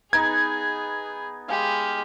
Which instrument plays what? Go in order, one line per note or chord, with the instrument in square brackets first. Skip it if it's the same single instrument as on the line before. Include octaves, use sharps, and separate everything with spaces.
[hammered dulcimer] B3 D#4 B4 [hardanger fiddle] G#4 [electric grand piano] G#6
[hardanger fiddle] G#3 G4 [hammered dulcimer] F5 G#5